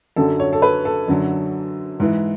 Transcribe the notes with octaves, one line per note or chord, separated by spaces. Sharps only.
F#2 D3 F#3 A4
C#5
A4
B4
A4
F#2 D3 F#3
G#2 E3